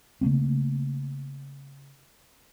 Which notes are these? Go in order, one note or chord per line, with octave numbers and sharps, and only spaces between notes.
C#3 A3 A#3 C4